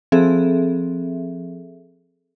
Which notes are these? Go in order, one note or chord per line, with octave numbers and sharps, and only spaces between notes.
F3 C4 G#4 A4 E5